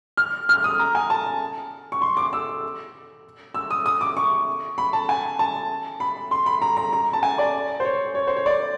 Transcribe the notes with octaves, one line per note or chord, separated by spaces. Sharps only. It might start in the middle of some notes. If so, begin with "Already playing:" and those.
F6
F6
D#6
A#5
G#5
A5
C#6
C6
D6
E6
E6
D#6
D#6
D6
C#6
B5
A5
G#5
A5
B5
C6
B5
A#5
A#5
A#5
A5
G#5
D5
C5
C#5
C#5
C5
C#5
D5